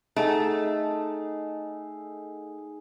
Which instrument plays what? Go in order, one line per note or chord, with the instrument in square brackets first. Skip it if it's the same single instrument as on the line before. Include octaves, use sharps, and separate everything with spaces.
[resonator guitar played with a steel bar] A3 [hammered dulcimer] D#4 G#4 F#5